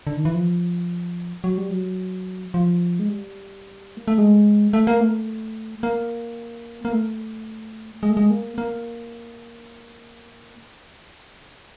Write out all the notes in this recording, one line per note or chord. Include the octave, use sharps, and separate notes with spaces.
D3
D#3
E3
F3
F#3
G3
F#3
F3
G#3
G3
A#3
A3
G#3
A3
A#3
A3
A#3
A#3
A3
G#3
A3
G#3
A#3
A#3